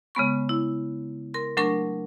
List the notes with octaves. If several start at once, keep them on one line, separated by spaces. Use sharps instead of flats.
C#3 G#3 B3 C#6
E4
A#4 C6
F#3 A3 D4 A#4 C#6